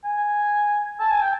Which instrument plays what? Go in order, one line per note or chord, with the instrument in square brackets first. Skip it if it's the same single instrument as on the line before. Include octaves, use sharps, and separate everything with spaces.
[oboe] G#5
A5
G#5
G5